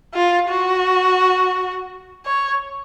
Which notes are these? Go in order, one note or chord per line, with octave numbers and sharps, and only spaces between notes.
F4
F#4
C#5